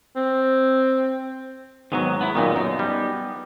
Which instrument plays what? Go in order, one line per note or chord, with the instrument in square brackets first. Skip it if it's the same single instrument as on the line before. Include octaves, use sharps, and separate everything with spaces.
[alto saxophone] C4
[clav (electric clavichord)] G#2 F#3 [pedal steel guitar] D#3 B3
[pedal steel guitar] B3 E4
[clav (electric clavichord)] F#2 A#2 D#3 [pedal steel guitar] B3 D#4
[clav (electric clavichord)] F#2
G3